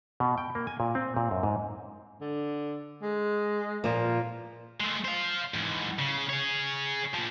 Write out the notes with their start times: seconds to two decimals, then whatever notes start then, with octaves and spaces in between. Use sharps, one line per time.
0.20 B2
0.38 G5
0.55 A#3
0.67 G#5
0.80 A#2
0.95 C4
1.17 A#2
1.31 F#2
1.43 G#2
2.21 D3
3.02 G#3
3.84 A#2 F3 A#3
4.80 G#3 A3
5.05 C5 F5
5.54 G#2 E3
5.99 C#3
6.29 G#4 C#5
7.14 A#2 F3